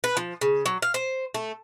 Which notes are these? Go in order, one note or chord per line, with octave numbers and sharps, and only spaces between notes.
B4
F3
C#3
F#3
F5
C5
A3